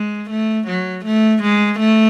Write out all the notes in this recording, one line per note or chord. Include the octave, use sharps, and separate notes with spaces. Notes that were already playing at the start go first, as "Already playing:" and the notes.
Already playing: G#3
A3
F#3
A3
G#3
A3